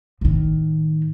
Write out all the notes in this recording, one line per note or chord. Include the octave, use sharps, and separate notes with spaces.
A2 D#3